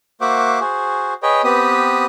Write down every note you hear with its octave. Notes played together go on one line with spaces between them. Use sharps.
A#3 F#4 C5 E5 F#5 D6
F#4 G#4 C5
G#4 B4 C#5 D#5 G5
B3 C4 G4 B4 D#6